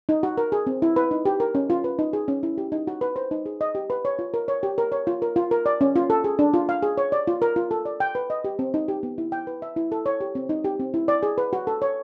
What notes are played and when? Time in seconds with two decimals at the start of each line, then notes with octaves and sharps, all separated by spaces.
0.09 D#4
0.23 F#4
0.38 A#4
0.52 G#4
0.67 C4
0.82 E4
0.96 B4
1.11 D#4
1.25 G4
1.40 A#4
1.55 C#4
1.70 F4
1.84 B4
1.99 D#4
2.13 G#4
2.28 C#4
2.43 E4
2.58 G4
2.72 D#4
2.87 F#4
3.01 B4
3.16 C5
3.31 D#4
3.46 G#4
3.61 D#5
3.75 G4
3.90 B4
4.05 C#5
4.19 F4
4.34 A#4
4.48 C#5
4.63 G4
4.78 A#4
4.92 C#5
5.07 F4
5.22 A#4
5.36 F4
5.51 A#4
5.66 D5
5.81 C#4
5.96 F4
6.10 A4
6.24 G#4
6.39 D4
6.54 F4
6.69 F5
6.83 G#4
6.98 C#5
7.12 D5
7.27 F4
7.42 A#4
7.56 F4
7.71 A4
7.85 D5
8.00 G5
8.15 B4
8.30 D#5
8.44 G4
8.59 C4
8.74 D#4
8.88 G4
9.03 B3
9.18 E4
9.32 G5
9.47 B4
9.62 E5
9.76 E4
9.92 A4
10.06 C#5
10.21 G4
10.35 C4
10.49 D#4
10.64 G4
10.80 C4
10.94 E4
11.08 D5
11.23 G#4
11.38 B4
11.53 F#4
11.67 A4
11.82 C#5